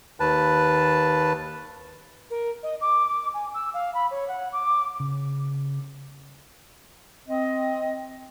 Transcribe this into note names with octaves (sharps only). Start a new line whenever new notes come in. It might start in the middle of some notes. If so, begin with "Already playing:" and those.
D#2 B4 A5
A#4
D#5
D6
G#5
E6
F5
B5
C#5
F#5
D6
C#3
C4 D#5